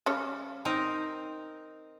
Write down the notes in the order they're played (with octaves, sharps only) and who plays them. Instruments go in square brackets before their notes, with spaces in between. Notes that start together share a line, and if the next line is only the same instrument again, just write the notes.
[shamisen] C#3 G3 C#5
[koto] C4 D#4 A#4